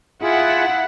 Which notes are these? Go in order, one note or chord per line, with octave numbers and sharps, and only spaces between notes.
E4 F4 G#4 F#5